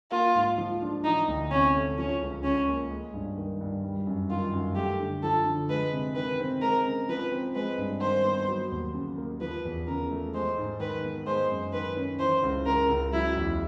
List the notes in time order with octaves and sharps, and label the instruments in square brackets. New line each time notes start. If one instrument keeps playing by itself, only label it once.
[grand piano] A#3 [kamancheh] F4
[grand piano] G#2
F3
D4
[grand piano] E3 [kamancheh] D#4
[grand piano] D2
[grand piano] C3 [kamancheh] C#4
[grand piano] A3
[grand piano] F3 [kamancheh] C#4
[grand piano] C#2
[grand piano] C#3 [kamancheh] C#4
[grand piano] A#3
G#3
G2
D#3
G2
G3
F#2
[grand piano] D#3 [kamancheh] F4
[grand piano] F#2
[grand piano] A3 [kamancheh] G4
[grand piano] D3
[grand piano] F3 [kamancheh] A4
[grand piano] D3
[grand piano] G#3 [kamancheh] B4
[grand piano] C3
[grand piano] D#3 [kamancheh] B4
[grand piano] C4
[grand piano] G#3 [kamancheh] A#4
[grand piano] C#3
[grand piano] F3 [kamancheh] B4
[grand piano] C4
[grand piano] G#3 [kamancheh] B4
[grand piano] G2
[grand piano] D#3 [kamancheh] C5
[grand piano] B3
F#3
D#2
C#3
A#3
[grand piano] F3 [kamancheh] B4
[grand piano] E2
[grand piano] C#3 [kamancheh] A#4
[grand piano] A3
[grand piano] G#3 [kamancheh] C5
[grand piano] G#2
[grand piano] D#3 [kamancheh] B4
[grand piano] B3
[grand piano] G#3 [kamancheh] C5
[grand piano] F#2
[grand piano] D#3 [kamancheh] B4
[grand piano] C#4
[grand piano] E3 [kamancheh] C5
[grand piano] C#2
[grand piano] C#3 [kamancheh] A#4
[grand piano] C#2
[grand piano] F#3 [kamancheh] E4
[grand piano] E2